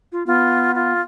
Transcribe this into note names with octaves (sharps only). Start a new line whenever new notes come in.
F4
B3 F4
F4